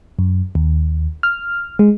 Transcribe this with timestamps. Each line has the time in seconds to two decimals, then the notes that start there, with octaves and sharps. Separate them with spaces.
0.19 F#2
0.55 D#2
1.23 F6
1.79 G#3